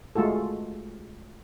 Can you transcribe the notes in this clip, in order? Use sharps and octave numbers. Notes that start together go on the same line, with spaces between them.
G#3 A3 F4 F#4 A4